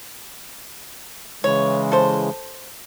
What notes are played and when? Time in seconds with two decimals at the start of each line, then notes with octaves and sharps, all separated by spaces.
1.44 C#3 E3 G#3 C#5
1.92 A4 C5